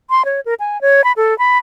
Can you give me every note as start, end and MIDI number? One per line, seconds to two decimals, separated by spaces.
0.10 0.25 84
0.25 0.40 73
0.46 0.54 70
0.60 0.80 80
0.81 1.04 73
1.04 1.12 83
1.17 1.37 69
1.39 1.58 83